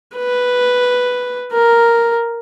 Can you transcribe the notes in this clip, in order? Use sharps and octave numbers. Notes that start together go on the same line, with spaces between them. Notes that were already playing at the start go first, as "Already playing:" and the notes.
B4
A#4